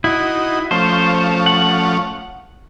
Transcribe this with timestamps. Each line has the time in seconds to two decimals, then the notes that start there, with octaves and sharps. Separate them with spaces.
0.04 D#4 E4 F#4
0.71 F3 A3 C#4 C5
1.46 F#5